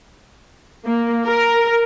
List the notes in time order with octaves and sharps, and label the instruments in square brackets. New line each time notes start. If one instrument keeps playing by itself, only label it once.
[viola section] A#3
A#4